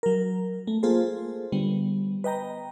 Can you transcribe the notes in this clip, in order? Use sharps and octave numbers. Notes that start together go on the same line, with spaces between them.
F#3 A#4
A3
A#3 F4 G#4 A4 C5
D3 G3 B3
B4 D#5 G5 A#5